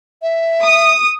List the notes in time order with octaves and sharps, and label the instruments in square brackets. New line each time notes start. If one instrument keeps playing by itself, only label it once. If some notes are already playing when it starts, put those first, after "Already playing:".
[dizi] E5
[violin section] D#6